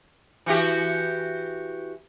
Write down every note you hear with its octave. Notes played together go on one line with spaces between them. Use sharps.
E3 F#4 G4